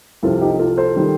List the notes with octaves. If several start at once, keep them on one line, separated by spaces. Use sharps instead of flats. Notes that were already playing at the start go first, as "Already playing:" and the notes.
C2 C3 F3 F4 A4
D#4 G4
F4 A4
A4 C5
D#3 G3